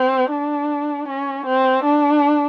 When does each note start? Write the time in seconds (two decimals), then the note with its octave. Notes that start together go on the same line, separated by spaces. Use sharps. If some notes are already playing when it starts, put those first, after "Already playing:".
Already playing: C4
0.31 D4
1.08 C#4
1.46 C4
1.84 D4